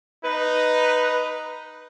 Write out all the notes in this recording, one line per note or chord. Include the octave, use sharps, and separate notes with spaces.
D#4 B4